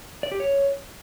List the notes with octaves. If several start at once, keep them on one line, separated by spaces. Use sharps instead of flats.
D5
G4
C#5